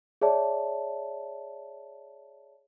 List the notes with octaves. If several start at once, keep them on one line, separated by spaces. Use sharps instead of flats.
G#4 C#5 D5 E5 A5